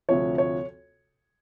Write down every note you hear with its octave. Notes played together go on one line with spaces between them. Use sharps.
D2 C3 F3 C#5
C#5